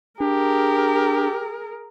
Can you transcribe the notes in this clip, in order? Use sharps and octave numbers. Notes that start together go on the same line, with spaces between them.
D4 G4 G#4 A#4